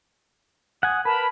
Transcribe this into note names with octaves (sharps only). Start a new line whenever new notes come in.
F#5 G#5 D#6
A#4 B4 A5 B5